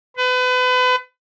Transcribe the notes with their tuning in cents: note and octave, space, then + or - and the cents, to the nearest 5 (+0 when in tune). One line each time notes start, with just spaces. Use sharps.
B4 +35